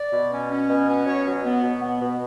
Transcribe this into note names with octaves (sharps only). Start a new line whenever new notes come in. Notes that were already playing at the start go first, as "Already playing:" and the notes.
Already playing: D5
B2
C#4
C#4
B2
C#4
B2 C#5
F#3
B3
B2
B3
B2